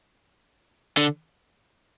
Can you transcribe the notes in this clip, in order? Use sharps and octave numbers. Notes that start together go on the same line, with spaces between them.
D3